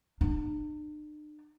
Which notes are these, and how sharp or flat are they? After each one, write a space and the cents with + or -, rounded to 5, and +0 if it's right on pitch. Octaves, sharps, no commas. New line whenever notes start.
D4 +45